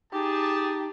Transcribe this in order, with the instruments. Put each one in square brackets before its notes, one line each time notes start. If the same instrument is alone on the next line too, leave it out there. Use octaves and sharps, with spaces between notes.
[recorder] D#4 [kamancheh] G4 [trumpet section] G#4 A5